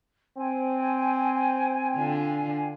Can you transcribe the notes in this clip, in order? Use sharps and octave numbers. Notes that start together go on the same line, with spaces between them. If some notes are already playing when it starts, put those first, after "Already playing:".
C4 G5 G#5
D3 D4 F4